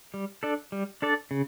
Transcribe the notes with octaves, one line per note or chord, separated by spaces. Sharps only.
G3
D4 A4 D5
G3
D4 A4 D5
C#3